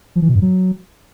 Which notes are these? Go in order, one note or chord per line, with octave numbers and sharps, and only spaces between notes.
F3
E3
B2
G2
F#3